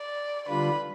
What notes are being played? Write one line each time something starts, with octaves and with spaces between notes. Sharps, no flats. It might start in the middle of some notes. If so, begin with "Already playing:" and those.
Already playing: D5
D3 G3 D4 F4 B4